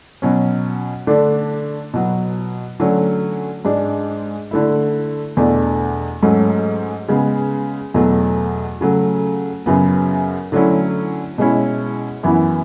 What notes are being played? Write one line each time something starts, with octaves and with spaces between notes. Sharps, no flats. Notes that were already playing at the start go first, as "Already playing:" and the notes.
B2 F#3 C#4
D3 A3 D4
B2 F#3 B3
D3 F#3 A3 C#4
G#2 G#3 D4
D3 A3 E4
E2 B2 A3 D4
G#2 F#3 A3 C#4
C#3 G#3 B3
E2 B2 F#3 A3
C#3 F#3 A3
F#2 C#3 F#3 B3
D3 F#3 A3 C#4 E4
B2 G#3 C#4 E4
F#2 E3 B3 E4